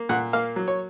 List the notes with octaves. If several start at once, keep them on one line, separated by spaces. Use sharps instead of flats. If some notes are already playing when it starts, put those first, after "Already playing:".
Already playing: A#3
A#2 F#5
A#3 F5
F#3
C#5